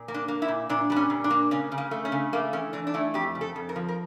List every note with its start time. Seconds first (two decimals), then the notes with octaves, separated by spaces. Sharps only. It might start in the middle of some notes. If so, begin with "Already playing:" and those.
Already playing: A#2
0.08 A#3
0.14 D4
0.28 A#3
0.42 E4
0.48 A#2
0.69 A#2 D4
0.90 G3 D4
0.96 C#4
1.10 A#2
1.24 D4
1.30 A#3
1.51 C#3 C#4
1.72 C#3
1.78 A#3
1.91 A3
2.05 C#4
2.12 C#3
2.33 A3 A#3
2.53 E3 C#4
2.73 E3 D4
2.87 D4
2.94 A3 E4
3.14 F2 G4
3.35 C#3
3.41 A4
3.56 F2
3.69 A#4
3.76 F3
3.88 A#4